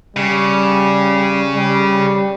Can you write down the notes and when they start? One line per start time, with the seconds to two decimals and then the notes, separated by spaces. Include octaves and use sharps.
0.16 C#3 G3
1.55 G3